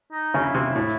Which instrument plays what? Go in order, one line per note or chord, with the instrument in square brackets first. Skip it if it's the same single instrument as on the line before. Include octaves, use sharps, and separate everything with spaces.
[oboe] D#4
[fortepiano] C#3
[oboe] E4
[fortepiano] C3
A2